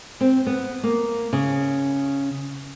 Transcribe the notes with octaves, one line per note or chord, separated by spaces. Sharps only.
C4
B3
A#3
C#3